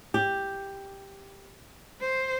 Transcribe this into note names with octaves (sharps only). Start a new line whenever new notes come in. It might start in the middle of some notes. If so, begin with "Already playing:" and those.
G4
C5